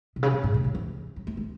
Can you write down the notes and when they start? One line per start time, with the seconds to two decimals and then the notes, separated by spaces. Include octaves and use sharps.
0.16 B2
0.23 C#3
0.33 B2
0.44 A2
0.54 B2
0.64 D3
0.75 E3
1.16 F#3
1.27 A3
1.37 G#3